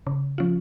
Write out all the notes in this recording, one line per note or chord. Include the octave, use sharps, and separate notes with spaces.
C#3
F3 C#4 F4